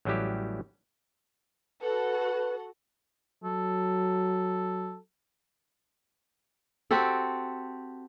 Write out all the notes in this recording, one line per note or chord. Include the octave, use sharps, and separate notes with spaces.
A1 F#3 G3 E4 G4
F#4 A4 B4 F#5
F#3 A4
C4 F#4 G4 A4